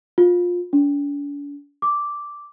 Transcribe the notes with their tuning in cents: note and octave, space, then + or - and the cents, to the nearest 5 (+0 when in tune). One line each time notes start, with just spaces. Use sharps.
F4 +20
D4 -45
D6 -5